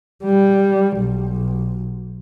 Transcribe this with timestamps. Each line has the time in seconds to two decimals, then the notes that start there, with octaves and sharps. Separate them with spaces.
0.25 G3
0.98 B1